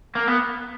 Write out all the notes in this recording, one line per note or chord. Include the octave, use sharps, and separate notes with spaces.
A#3
B3